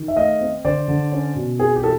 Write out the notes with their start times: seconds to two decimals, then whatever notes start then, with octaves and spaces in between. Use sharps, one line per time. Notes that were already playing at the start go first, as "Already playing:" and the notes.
Already playing: D#3
0.08 E5
0.17 A3 D#5 F5
0.41 C4
0.65 D3 C5 D5
0.88 D3
1.12 C#4
1.36 B2
1.59 C4 G#4
1.76 G4
1.83 E3 A4